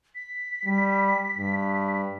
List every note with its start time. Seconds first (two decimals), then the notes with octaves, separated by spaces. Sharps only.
0.15 B6
0.65 G3
1.38 G2